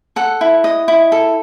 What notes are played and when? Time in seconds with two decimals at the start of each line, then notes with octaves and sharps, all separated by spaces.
0.16 A4 F#5
0.41 E4
0.64 D#5
0.88 E4
1.12 A4